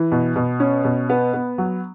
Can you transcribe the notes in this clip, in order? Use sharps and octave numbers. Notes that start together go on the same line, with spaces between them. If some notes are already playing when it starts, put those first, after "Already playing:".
Already playing: E3
B2
B2
C#4
B2
B3
B3
F#3